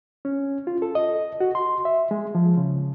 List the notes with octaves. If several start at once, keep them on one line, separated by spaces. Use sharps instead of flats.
C#4
F4
A4
D#5
F#4
C6
E5
G#3
F3
C#3